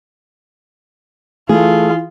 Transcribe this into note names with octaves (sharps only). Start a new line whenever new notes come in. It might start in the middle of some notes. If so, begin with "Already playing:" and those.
E3 A3 F4 G#4